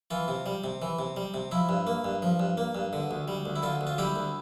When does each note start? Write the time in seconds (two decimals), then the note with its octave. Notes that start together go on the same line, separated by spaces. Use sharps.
0.11 E3 F4
0.28 C3
0.46 G3
0.64 C3
0.82 E3
0.99 C3
1.16 G3
1.34 C3
1.51 F3 E4
1.69 G2
1.87 A#3
2.04 G2
2.22 F3
2.40 G2
2.57 A#3
2.75 G2
2.93 D3
3.11 D2
3.28 G3
3.46 D2
3.56 E4
3.63 D3 F4
3.81 D2
3.87 F4
3.98 G3 E4 G4
4.16 D2